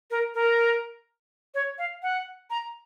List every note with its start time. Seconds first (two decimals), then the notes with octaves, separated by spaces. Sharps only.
0.11 A#4
0.34 A#4
1.54 C#5
1.78 F5
2.03 F#5
2.50 A#5